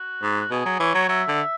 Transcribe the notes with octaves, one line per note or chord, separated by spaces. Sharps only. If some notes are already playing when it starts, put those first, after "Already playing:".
Already playing: F#4
G#2
F#4
B2 G#4
F#3
E3 C#5
F#3
F#3 E5
D3